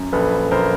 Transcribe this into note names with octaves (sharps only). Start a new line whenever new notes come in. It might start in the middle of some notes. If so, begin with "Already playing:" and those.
Already playing: F#2
A#1 A4 B4
A#1 A#4 C5